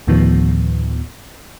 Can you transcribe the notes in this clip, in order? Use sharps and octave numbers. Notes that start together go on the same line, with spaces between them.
D2 A2 D#3 F3 B3